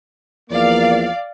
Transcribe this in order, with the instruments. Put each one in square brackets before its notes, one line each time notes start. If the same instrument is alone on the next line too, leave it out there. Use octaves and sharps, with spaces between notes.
[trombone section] E2 F3 A#3 [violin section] D5 F5